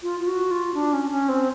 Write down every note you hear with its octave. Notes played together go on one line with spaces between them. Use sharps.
F4
F4
F#4
F4
D4
C#4
C#4
C4